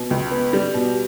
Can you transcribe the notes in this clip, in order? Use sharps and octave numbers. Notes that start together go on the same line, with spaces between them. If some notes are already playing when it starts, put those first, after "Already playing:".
Already playing: B2
C#2
B3
G3
B2